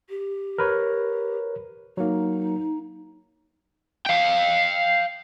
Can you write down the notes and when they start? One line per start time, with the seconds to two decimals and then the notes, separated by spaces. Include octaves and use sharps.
0.09 G4
0.58 A#4 B4 C#5
1.97 F#3 A#3 D#4
4.07 F5 G5